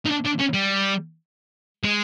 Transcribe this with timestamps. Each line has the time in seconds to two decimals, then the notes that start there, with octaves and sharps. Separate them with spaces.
0.06 D#4
0.11 D4
0.26 D4
0.40 C#4
0.54 G3
1.84 G#3